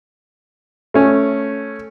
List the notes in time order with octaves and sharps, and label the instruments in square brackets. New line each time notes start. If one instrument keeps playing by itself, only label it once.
[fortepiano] A3 C#4